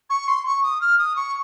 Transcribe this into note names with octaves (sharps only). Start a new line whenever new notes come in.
C#6
C6
C#6
D#6
F6
D#6
C#6